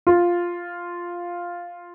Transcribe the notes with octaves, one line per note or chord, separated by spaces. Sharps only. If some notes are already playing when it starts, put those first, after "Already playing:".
F4